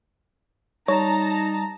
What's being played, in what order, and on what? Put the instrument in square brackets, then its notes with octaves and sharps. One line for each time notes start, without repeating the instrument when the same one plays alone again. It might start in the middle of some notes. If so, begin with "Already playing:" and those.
[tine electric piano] G3 [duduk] D#4 [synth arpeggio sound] C#5 [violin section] A5 A#5